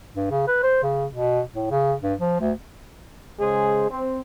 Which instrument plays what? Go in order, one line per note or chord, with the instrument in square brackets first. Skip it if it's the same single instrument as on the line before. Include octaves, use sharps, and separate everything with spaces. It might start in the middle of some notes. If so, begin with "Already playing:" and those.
[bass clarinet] G2
C#3
B4
C5
C#3
B2
A2
C#3
G2
F3
D2
[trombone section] C#3 G#3 G#4 C5
C4